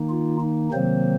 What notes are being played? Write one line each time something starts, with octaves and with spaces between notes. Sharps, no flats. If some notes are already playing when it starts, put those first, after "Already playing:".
Already playing: D#3 A#3 D#4
F4
D#4
C3 D#3 F#3 A#3 C4 C5